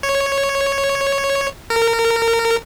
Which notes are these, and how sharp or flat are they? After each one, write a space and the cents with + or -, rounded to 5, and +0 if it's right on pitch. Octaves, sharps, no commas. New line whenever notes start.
C#5 -5
A#4 -25